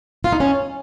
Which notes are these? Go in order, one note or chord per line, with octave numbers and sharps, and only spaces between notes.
F4
D#4
C#4